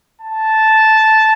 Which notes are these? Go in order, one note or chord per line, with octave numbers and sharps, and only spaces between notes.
A5